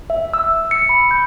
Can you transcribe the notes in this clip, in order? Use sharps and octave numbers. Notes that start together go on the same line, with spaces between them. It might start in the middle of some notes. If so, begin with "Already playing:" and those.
E5
E6
C#7
B5
G6